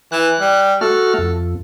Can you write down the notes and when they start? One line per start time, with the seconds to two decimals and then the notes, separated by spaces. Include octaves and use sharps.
0.12 E3 F#6
0.40 G3
0.81 A3 F#4 A4 F6
1.18 F2